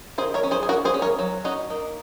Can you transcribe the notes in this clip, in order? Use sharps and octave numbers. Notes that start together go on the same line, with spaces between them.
D#3 G#4 C5
A#4 C#5
C#4
G#4 C5
G#4
C#4 F#4 A#4
G#4 C5
C#4
A#4 C#5
F#3
C#4 D#4 F#4
A#3 D#4